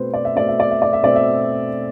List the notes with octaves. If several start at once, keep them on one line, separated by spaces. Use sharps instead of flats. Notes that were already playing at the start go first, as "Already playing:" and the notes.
Already playing: B2 A3 C4 B4 C5
D5
E5
B2 A3 C4 D5
E5
D5
E5
D5
E5
B2 A3 C4 D5
E5